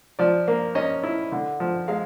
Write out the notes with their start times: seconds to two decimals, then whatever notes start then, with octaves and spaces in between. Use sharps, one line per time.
0.19 F3 D5
0.48 A#3
0.75 C#4 D#5
1.04 E4
1.32 D3
1.60 F3
1.88 G#3 F5